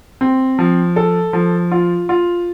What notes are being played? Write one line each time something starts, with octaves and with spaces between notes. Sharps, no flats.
C4
F3
A4
F3
F4
F4